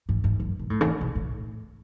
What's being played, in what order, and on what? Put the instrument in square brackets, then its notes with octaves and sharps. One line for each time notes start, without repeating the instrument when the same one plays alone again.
[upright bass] G#2
G#2
F#2
B2
A2
C#3
D3
B2
A2